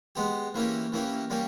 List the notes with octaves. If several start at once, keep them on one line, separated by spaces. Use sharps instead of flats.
G#3 B3 G4
E3 A#3 C#4 G4
E3 A#3 C#4 G4
G3 A#3 C#4 G4